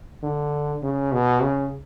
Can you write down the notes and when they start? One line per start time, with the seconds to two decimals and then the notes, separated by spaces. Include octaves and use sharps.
0.23 D3
0.82 C#3
1.12 B2
1.42 C#3